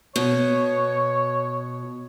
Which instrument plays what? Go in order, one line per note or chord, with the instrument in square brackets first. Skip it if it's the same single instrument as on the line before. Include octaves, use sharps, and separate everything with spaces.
[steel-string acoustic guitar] B2 [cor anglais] C#5